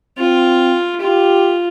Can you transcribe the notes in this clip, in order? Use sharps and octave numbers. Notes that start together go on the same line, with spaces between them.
C4 F4
F4 G4